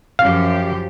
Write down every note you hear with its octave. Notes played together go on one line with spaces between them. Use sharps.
F#2 F3 G4 F5